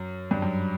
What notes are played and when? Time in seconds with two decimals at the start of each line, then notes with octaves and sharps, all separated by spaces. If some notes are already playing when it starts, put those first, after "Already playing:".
Already playing: F#2
0.31 G2
0.42 F#2